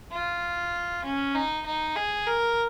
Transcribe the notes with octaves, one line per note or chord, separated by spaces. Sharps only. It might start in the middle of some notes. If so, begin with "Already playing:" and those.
F4
C#4
D#4
D#4
G#4
A#4